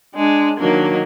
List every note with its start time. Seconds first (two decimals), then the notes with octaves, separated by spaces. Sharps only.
0.15 G#3 D4
0.59 D#3 F#3 A#3 D4